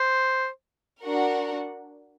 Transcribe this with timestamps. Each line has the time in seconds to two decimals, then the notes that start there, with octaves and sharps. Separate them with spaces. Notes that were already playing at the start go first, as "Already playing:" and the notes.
Already playing: C5
1.04 D4 F#4 A#4 F#5